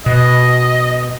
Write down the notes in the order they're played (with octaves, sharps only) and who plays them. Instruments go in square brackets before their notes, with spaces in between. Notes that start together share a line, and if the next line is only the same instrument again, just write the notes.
[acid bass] B2 [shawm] D#5